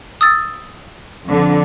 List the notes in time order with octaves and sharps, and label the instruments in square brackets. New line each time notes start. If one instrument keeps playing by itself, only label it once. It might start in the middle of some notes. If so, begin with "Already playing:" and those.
[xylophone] D#6 E6 A6
[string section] F2 D3